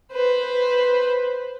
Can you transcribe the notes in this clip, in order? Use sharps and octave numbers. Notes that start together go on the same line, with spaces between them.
B4 C5